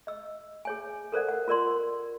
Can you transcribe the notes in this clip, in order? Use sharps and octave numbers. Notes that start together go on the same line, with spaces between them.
D#5 E6
G#4 C#5 G#5
A4 A#4 C5 D5 F#5
F#5
F4 A#4 D5 C6